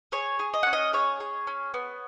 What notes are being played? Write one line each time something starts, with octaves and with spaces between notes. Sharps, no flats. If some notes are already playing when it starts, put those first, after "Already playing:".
G#4 C#5
G#4
D#5
C#4 F#5
D#5
G#4 C#5
G#4
C#4
B3